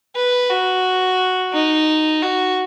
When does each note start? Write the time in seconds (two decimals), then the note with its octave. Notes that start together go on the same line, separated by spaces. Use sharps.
0.16 B4
0.50 F#4
1.53 D#4
2.23 F#4